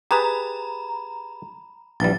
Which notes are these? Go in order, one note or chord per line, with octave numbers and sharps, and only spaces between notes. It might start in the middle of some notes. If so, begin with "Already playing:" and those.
G4 G#4 B4 A#5 B5
A#1 E3 G3 A6